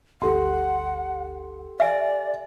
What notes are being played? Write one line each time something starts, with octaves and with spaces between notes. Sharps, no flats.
G1 D2 G4 A4 F#5 C6
D5 E5 G#5